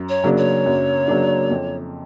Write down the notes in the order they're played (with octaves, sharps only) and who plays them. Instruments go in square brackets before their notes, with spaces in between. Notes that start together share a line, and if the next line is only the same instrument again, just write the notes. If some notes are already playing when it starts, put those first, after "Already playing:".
Already playing: [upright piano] F#2
[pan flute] C#5
[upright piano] C#3 F#3 A#3 D4
[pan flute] C#5
[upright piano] F#2
C#3 F#3 A#3 D4
F2